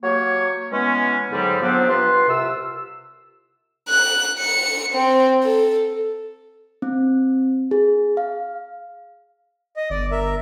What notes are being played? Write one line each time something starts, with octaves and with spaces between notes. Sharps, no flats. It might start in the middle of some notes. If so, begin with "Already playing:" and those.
F#3 A#3 G4 C#5
E3 G#3 B3 C#4
G#2 D3 F#3 G3
F3 F#3 B3 C4 D4
G2 F4 B4 C6
C2 C3 F4 E6
F#6
C#7
C4
A4
C4
G#4
F5
D#5
G1 D5
A#4 E5